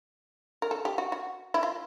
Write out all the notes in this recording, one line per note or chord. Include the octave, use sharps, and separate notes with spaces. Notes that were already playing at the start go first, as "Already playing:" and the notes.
A#4
A4
G4
F#4
F#4
E4
F4